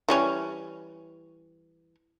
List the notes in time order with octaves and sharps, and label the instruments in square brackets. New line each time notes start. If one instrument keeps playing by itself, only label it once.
[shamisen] E3 G3 C#4